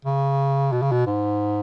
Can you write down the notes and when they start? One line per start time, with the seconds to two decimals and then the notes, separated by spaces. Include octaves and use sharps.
0.05 C#3
0.72 B2
0.82 C#3
0.92 B2
1.06 G#2